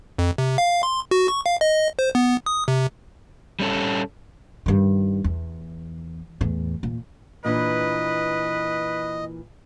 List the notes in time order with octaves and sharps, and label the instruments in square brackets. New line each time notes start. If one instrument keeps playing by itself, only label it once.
[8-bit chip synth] F2
C3
F5
C6
F#4
C#6
F5
D#5
C5
B3
D#6
C3
[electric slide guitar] G3 C#4 A4
[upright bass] G2 D#3
E2
E2 A2
A#2
[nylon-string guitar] A#2 E3 D4 [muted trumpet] B4 [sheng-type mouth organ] D#5